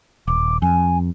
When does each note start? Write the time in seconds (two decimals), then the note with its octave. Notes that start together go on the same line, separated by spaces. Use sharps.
0.28 D#1 D6
0.62 F2 G#5